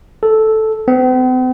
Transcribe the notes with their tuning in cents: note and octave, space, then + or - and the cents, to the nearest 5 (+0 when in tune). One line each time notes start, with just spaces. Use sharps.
A4 -5
C4 -45